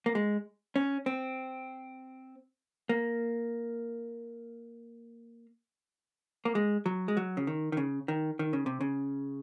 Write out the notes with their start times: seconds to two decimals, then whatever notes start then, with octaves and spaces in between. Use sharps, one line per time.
0.06 A#3
0.15 G#3
0.76 C#4
1.06 C4
2.89 A#3
6.45 A#3
6.55 G#3
6.86 F#3
7.08 G#3
7.17 F#3
7.37 C#3
7.47 D#3
7.72 D#3
7.77 C#3
8.08 D#3
8.39 D#3
8.53 C#3
8.66 C3
8.81 C#3